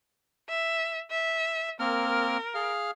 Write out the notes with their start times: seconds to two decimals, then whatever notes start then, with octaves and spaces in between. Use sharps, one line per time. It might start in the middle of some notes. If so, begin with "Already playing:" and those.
0.49 E5
1.11 E5
1.80 A#3 C4 A#4 F6
2.54 G#4 F5 F6